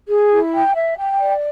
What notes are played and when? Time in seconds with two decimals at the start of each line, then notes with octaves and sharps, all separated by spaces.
0.08 G#4
0.31 E4
0.53 G5
0.75 E5
0.97 G5
1.19 D5